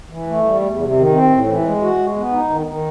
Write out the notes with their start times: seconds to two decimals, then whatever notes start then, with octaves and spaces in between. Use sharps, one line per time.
0.10 E3
0.27 A3
0.44 G3
0.61 E2
0.79 C3
0.95 D#3
1.13 C4
1.30 A2
1.47 E3
1.63 G#3
1.82 F#4
1.98 G#3
2.16 B3
2.32 D#4
2.49 D#3
2.67 D#3